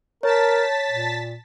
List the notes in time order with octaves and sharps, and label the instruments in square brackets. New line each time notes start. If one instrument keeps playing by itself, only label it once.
[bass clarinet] A#4 [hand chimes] C#5 [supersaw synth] A5 A6 B6
[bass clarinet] A#2